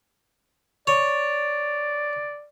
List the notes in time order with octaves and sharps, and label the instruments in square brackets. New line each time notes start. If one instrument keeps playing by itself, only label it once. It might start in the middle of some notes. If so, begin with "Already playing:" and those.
[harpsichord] C#5 [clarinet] D5